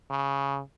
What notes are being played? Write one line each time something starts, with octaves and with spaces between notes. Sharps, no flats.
C#3